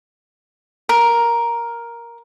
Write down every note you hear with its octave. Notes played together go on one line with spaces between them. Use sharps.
A#4